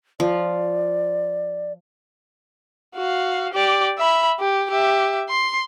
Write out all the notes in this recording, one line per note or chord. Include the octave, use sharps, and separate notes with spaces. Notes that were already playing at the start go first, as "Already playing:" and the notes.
F3 D5
F#4 F5
G4 D5
E5 B5
G4
G4 E5
C6